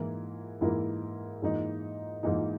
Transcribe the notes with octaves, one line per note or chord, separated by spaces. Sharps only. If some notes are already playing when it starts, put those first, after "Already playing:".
Already playing: G#2 E3 A#3 E4 A#4
G#2 E3 A#3 E4 A#4
G#2 E3 A#3 D#4
G#2 E3 A#3 D#4